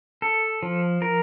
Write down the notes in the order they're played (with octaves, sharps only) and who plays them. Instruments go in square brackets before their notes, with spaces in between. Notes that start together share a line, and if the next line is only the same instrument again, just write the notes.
[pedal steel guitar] A4
F3
A#4